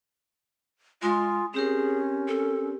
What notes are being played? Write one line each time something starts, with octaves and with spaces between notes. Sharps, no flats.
G#3 F4 G#5 C6 D#6
C4 C#4 G4 G#4 A#4
A4